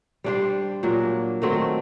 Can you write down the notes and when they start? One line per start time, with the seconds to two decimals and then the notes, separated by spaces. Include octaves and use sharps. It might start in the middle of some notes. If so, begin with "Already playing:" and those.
0.24 G3 D4 G4 C5
0.83 A#2 F#3 A#3 D4
1.42 D#3 F#3 A3 C4